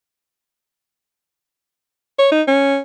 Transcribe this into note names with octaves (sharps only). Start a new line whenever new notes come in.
C#5
D#4
C#4